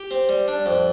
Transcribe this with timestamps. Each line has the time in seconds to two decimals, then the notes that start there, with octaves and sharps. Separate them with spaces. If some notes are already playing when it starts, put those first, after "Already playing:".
Already playing: G4
0.11 C4
0.29 G3
0.48 D4
0.66 F2